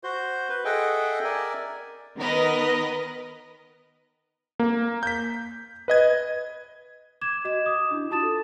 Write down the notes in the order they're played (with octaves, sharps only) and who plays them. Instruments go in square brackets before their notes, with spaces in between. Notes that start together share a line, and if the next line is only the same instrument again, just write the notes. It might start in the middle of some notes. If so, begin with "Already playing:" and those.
[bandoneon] F#4 C5 G6
B4
G#4 A4 D#5 E5 F#5 G5
A#4 D5 E5 G#5
[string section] D#3 B3 A#4 B4 D#5
[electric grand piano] A#3
G6 B6
B4 D#5 G#6
[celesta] D6 G#6 E7
F#4 D#5 E7
D6 D#6
D4 E4
F4 F#4 A5 D#6 A6 E7
A4